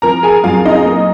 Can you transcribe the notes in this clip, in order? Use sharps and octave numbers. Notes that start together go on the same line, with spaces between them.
F3 A#4 A#5
G#4 G#5
F#2 F4 F5
D#4 D#5
A#3